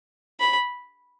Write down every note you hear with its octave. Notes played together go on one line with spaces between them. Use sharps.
B5